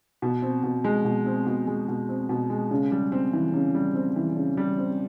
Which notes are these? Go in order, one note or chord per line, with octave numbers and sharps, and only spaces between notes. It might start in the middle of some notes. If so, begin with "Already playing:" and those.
B2
C4
B2
G#3
B2
C4
B2
G#3
B2
C4
B2
G#3
C#3
G3
C4
E3
C#3
G3
C4
E3
C#3
G3
C4